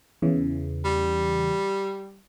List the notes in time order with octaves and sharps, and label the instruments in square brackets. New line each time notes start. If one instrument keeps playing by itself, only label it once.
[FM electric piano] E2 C#3 E3
[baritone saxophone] G3